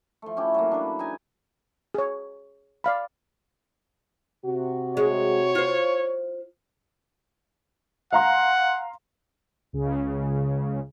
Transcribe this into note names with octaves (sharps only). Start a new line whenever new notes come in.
F3 A3
C#4 E4 G4
F#3 A#3
D4 B4
D#4 G#5
G#4 C#5
D5 F5 B5
C3 F#4
G#3 C#5
F4 C5
F5 F#5 A#5 C6
C#2 C#3